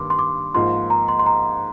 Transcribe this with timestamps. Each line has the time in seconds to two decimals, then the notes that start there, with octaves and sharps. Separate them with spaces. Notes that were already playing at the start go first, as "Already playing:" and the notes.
Already playing: G2 D#3 A#3 C6 D6
0.10 C6
0.19 D6
0.55 G#2 F3 A#3 F4 C6
0.90 A#5
1.08 C6
1.19 C6
1.26 A#5